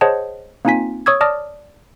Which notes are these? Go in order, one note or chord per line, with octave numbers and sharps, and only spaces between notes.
G#4 C5 C#5 D#5 F#5 A5
A#3 C4 D#4 F4 G#5 B6
C#5 C#6 D#6 E6 G#6
D5 A5 D6 D#6 F6 A#6